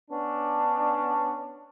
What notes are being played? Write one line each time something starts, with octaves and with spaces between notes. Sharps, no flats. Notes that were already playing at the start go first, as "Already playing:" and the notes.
B3 C#4 D4